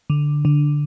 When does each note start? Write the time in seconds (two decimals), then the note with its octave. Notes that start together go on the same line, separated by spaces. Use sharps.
0.10 D3
0.45 D3